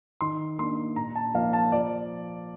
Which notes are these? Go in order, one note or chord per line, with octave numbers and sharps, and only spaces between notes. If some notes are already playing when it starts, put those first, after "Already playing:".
D#3 C6
A#3 D4 C6
A#2 A#5
A5
F3 A#3 D#4 F5
A5
F3 D5